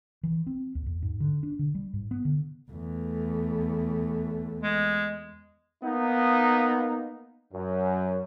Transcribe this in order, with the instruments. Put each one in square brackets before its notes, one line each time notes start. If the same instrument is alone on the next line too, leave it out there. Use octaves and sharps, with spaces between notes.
[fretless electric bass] E3
C4
D#2
E2
G#2
D3
D4
D3
G3
G#2
B3
D3
[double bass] E2 A3
[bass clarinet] G#3
[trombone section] A#3 B3 D#4
F#2